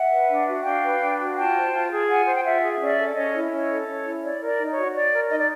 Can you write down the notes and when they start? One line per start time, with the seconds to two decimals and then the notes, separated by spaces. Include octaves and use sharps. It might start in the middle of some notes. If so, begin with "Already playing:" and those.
Already playing: E5 F#5
0.11 B4
0.29 D4
0.47 F#4
0.64 D4 F5 G5
0.84 B4
1.01 D4
1.19 F#4
1.36 F4 G5 A5
1.55 C5
1.73 F4
1.91 G#4
2.08 F4 F#5 G#5
2.25 C5
2.34 G5
2.43 F4 E5 F#5
2.62 G#4
2.80 C#4 D5 E5
2.97 A4
3.15 C#4 C#5 D#5
3.34 E4
3.51 C#4 C#5 D#5
3.69 A4
3.87 C#4 C#5
4.04 E4
4.23 C#5 D5
4.40 A#4
4.47 D5
4.59 D#4
4.71 C#5
4.76 F#4
4.94 C#5 D5
5.12 A#4
5.30 D#4 D#5
5.38 D5